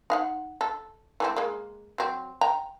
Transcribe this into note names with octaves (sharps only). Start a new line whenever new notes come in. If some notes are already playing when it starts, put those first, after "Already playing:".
D#4 F5 F#5
A4
E3 A3 C4
G#3 A#3
F#3 C4
G5 A#5